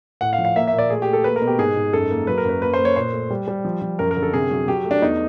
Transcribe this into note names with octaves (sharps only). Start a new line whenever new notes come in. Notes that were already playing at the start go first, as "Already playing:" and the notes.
A2 F#5
F5
F3
F5
A#3 E5
E5
A#2
D5
A3 G#4
G4
A3
A4
A#3 B4
A#4
B2
G4
G#2 G#4
G#2
F#2 A4
A#3
F#3 B4
A#4
F#2 B4
A#3 B4
C5
A#3
C#5
A#2 C5
A3
G3
G3
F3
F3
F#2 A#4
A#4
D3
A4
C3 G#4
F#3
F#3 G4
A3
D4
E2 D#4